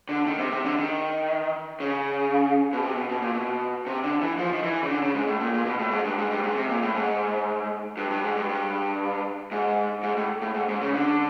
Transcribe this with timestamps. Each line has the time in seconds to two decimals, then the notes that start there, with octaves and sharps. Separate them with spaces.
0.09 D3
0.26 D#3
0.38 C3
0.51 C3
0.64 D3
0.78 D#3
1.80 C#3
2.73 B2
2.83 C3
2.96 B2
3.09 B2
3.22 A#2
3.35 B2
3.86 C3
4.03 D3
4.21 E3
4.38 F3
4.53 D#3
4.63 E3
4.83 C#3
4.89 D3
5.02 C#3
5.14 G#2
5.27 A2
5.40 A#2
5.54 A#2
5.66 B2
5.79 A2
5.91 G#2
6.04 G2
6.18 G#2
6.31 G2
6.44 G#2
6.56 C3
6.69 A#2
6.82 A2
6.95 G#2
7.97 G2
8.10 G2
8.23 G#2
8.36 G2
8.49 G2
9.51 G#2
10.03 G#2
10.16 A2
10.42 A2
10.54 G#2
10.68 G#2
10.81 C#3
10.94 D3